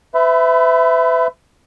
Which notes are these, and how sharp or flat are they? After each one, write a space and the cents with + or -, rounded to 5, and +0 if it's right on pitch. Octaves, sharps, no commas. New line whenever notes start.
B4 +40 E5 +0 B5 +15